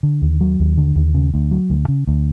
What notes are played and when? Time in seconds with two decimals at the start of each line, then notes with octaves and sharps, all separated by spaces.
0.03 D3
0.22 D#2
0.41 F#3
0.60 D#2
0.78 D3
0.96 D#2
1.14 C#3
1.34 D2
1.51 F#3
1.70 D2
1.88 C#3
2.07 D2